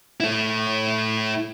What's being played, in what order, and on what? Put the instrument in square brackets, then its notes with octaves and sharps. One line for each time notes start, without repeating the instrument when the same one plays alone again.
[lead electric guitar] A3 E4